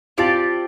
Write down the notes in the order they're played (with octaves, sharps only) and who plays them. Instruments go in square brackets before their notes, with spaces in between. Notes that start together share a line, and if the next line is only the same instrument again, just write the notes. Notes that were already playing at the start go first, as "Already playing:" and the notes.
[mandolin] C4 G4 D5 A5 [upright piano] F4